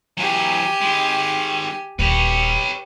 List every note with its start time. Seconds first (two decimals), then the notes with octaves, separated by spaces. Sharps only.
0.17 E3 F#3 G4 G#5
0.81 D#3 G#3
1.99 D#1 G4 B4 C#5